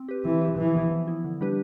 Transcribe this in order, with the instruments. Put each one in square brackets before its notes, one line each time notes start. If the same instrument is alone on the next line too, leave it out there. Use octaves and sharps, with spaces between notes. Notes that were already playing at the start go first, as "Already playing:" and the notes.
Already playing: [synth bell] C4
G4 B4
[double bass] E3 [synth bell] C4
[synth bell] G4 B4
[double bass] E3 [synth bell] F3
[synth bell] B3 E4
F3
B3 E4
D3
G3 D4 G4 B4